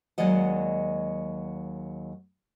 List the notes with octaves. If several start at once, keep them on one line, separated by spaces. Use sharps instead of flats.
D#2 F#3 G#3 D5 D#5 F#5